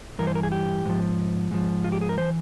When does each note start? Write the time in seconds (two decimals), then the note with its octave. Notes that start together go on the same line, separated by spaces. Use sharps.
0.19 G2 E3 A#4
0.27 C5
0.35 A#4
0.43 G#4
0.52 G4
0.85 G#2 F3
1.51 G#2 F3
1.84 F4
1.92 G4
2.01 G#4
2.09 A#4
2.17 E3 C5